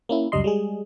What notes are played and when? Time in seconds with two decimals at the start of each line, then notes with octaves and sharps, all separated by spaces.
0.09 A#3 C#4 E4
0.32 C#2 F#2 G3 D#5 C6
0.44 G3 G#3 G#4